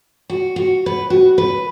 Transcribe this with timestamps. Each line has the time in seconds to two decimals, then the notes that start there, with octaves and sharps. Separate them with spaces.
0.30 F#4
0.56 F#4
0.86 B4
1.10 F#4
1.38 B4